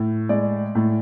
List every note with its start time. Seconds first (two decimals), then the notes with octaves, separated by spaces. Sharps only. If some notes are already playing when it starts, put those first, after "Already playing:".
Already playing: A2
0.29 G#3 D5
0.75 A2